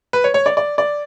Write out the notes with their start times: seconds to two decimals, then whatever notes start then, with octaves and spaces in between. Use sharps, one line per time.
0.13 B4
0.24 C#5
0.34 C#5
0.46 D5
0.57 D5
0.78 D5